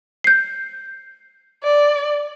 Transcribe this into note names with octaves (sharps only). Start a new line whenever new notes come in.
G6 C7
D5